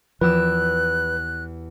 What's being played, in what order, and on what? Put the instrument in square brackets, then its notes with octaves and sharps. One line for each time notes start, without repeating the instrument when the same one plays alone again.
[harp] E2 G4 E6 [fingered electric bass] F3 [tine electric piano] B4 [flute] F#6